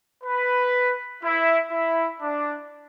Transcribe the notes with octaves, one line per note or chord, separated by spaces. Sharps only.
B4
E4
E4
D4